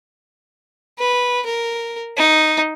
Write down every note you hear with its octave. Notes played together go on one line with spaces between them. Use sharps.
B4
A#4
D#4